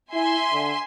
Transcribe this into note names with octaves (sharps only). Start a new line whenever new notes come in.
E4 E5 G#5 C6
D3